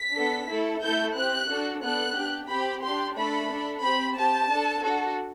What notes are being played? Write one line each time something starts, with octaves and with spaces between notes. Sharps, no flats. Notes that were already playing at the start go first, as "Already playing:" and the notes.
Already playing: B6
B3 D4 A4
A3 E4 A4
A3 E4 A4 G6
C4 G4 F#6
D4 F#4 A4
B3 D4 A4 F#6
D4 G4
C4 G4 B5
D4 G4 C6
A3 D4 A4 B5
D4 A4
C4 G4 B5
C4 G4 A5
D4 A4
D4 F#4 A4